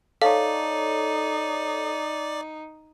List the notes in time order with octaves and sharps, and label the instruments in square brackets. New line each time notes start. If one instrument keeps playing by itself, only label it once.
[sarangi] D#4 [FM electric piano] A4 C#5 [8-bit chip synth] D5 [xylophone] F5